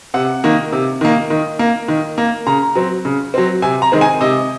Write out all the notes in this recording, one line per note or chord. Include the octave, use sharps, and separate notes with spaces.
C3 F#5
D#3 A#3
C3
D#3 A#3
D#3
A#3
D#3
A#3
C#3 A#5
F#3 C4
C#3
F#3 C4
C3 G#5
A#5
D#3 G#3 C4
G#5
C3 D#5